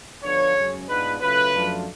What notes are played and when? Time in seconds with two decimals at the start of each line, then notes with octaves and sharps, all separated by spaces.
0.23 D2 D3 F3 B3 D4 C#5
0.56 F#2 C#3 G#3 C#4
0.88 G#2 G#3 B3 D4 F4 B4
1.21 C#3 F#3 A3 F4 B4
1.54 F#2 F3 A3 D4 F4